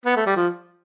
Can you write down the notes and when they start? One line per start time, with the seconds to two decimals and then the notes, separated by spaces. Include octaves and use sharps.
0.06 B3
0.16 A3
0.26 G3
0.36 F3